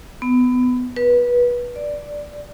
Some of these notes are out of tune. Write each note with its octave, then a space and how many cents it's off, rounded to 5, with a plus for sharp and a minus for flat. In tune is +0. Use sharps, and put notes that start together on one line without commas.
B3 +20
B4 -25
D5 +0